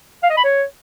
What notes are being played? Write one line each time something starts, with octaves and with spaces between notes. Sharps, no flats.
F5
D#5
B5
C#5